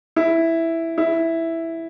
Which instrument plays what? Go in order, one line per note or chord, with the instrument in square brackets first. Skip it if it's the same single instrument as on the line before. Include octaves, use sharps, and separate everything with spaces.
[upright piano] E4
E4